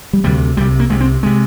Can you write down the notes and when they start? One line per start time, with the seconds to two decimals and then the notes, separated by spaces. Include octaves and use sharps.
0.13 G3
0.24 D2 C3 G3
0.57 C2 C3 G3
0.80 A#3
0.89 C2 C3 G#3
1.01 C4
1.23 C3 G#3